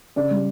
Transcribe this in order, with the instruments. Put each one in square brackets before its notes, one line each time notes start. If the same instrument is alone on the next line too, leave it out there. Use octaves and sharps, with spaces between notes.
[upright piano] C#3 D5
G3